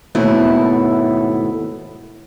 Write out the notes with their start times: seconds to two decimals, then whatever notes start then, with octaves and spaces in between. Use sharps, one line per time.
0.15 D#2 G#2 B2 A3 E4